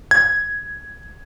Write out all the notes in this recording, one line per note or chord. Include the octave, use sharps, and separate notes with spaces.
G#6